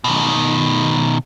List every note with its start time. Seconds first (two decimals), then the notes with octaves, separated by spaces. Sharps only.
0.04 B2 D#3